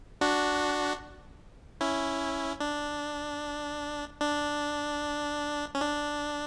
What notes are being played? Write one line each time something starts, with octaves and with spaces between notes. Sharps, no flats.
D4 F#4
C#4 E4
D4
D4
C#4
D4